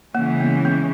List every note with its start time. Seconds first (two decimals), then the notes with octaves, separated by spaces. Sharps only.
0.15 C#3 E3 G#3 A#3 C#4
0.40 B3
0.65 B3